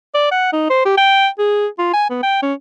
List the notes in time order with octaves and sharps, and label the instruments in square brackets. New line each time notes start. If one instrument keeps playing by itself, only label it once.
[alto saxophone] D5
F#5
D#4
C5
G4
G5
G#4
F4
G#5
B3
G5
C#4